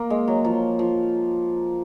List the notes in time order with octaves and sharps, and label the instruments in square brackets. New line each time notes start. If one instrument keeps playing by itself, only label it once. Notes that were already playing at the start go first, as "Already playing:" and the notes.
Already playing: [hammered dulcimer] A#3
G#3
F#3
F3
F3